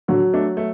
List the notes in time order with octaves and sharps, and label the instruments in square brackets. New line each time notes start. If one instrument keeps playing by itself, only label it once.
[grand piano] D3 [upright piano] F#3
[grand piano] A3 D4
A3